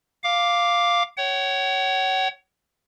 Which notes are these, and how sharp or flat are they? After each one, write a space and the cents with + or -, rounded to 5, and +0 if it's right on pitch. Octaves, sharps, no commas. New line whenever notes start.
F5 +0 D6 +0
C#5 +0 F#5 +40